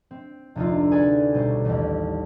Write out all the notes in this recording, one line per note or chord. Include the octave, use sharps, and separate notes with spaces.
C4
F1 D2 D#4 F4
F#4 G#4 B4 D5 G#5
B1 B2 G3 G4 G#4 C5
A1 D#2